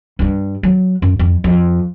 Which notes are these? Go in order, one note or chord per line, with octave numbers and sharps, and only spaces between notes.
G2 G3
F#3
F#2
F2
F2